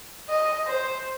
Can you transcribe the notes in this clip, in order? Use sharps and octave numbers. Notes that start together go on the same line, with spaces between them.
D#5
C5